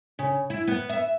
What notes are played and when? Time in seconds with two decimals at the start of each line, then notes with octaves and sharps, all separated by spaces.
0.19 C#3
0.50 E4
0.68 B3
0.89 E5